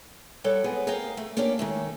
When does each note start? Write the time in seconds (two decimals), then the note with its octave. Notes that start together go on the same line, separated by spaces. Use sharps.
0.44 G3 A4 C#5 F#5 G5
0.64 G#3 B3 C4 G#4
0.87 G#4 A#4 D#5 F5 G5
1.17 A3
1.37 A#3 C#4 D4 G4 A4 A#4
1.59 D#3 G#3 A3